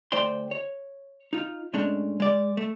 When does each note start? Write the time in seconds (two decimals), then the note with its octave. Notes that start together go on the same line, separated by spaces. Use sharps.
0.12 D2 A3 C5 D5 G5 C6
0.51 C#5
1.33 D#4 F4
1.73 A2 G#3 A3 C#4 D4
2.20 G#3 D5
2.57 A3